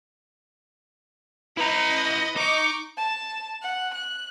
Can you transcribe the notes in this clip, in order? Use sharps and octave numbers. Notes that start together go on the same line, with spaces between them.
E4 B4 D#5 A#5
D#4 C#6 D6
A5
F#5
F#6